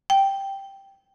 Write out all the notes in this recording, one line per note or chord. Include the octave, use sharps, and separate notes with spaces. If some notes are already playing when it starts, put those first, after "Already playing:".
G5